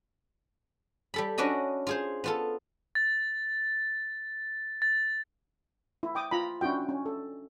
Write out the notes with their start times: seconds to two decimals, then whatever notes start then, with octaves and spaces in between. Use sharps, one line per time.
1.14 G3 A4 B5
1.38 C#4 D4 F#4 D#5 B5
1.87 F4 G#4 C5
2.24 B3 F4 A4
2.95 A6
4.82 A6
6.03 E4
6.15 G5 D6 D#6
6.31 F4 A#5 B5
6.61 C#4 D4 E4 F#4 G5
6.89 C#4
7.06 A4